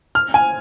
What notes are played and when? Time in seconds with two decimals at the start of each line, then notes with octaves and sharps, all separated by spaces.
0.15 F6
0.34 G#5